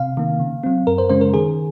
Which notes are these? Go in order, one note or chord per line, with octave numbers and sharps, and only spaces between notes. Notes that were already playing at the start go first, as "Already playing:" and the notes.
Already playing: C3 F5
D#3 A#3
C#3
F#3 C4
F#2 A#4
C5
C#3 G#3 C#4 C5
A#4
D#3 G#4